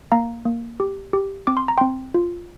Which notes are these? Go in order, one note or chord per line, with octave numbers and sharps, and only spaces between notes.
A#3 F5 A#5
A#3
G4
G4
C4 D6
C6
A#5
C4 G5 C6
F4